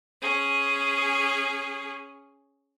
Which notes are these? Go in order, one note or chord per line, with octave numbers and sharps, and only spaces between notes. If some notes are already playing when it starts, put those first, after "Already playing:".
C#4 G#4